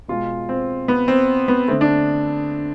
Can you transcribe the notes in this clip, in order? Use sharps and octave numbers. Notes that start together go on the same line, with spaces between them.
B2 G#3 F4
C4
B3
C4
B3
D3 A3 C4
D4